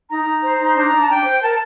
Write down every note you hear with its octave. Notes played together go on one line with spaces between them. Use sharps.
D#4 A#5
D#4
C5
D#4
D4 A#5
D4
A5
D4 G5
C5
A#4 A5